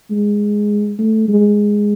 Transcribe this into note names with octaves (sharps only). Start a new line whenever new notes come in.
G#3
A3
G#3